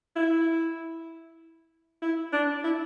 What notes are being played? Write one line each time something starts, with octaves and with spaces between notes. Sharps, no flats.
E4
E4
D4
E4